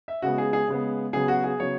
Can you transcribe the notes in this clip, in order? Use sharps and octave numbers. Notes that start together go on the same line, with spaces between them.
E5
C#3 G#3 B3 F#4
G#4
G#4
C#3 G#3 B3
C#3 F#3 B3 G#4
F#4
G#4
C#3 F#3 B3 C#5